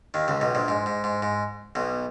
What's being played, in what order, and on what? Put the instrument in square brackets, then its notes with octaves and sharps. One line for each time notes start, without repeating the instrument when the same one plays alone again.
[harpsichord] D#2 D#3
C#2 C#3
B1 B2
A#1 A#2
G#2
G#2
G#2
G#2
B1 B2